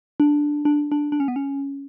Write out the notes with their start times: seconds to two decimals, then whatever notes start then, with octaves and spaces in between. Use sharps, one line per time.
0.20 D4
0.65 D4
0.92 D4
1.12 D4
1.20 C#4
1.28 B3
1.36 C#4